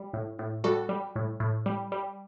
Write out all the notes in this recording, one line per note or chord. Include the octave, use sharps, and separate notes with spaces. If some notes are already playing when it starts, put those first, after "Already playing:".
Already playing: G3
A2
A2
G3 F#4 A4
G3
A2
A2
G3
G3